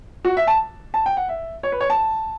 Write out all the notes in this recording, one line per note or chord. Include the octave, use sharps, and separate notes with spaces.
F#4
E5
A5
A5
G5
F#5
E5
C#5
B4
C#5
A5